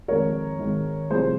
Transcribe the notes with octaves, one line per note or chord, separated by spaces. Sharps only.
F2 D#3 G#3 A#4 C#5
G#1 G#2 D#3 G#3
C2 C3 F3 G#4 C5